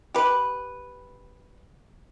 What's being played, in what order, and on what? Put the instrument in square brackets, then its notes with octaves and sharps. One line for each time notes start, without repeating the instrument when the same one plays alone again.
[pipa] G4 B4